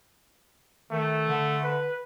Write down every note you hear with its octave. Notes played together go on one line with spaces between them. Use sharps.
D#3 A3
D3
B4